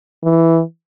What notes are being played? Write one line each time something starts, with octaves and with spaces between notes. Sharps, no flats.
E3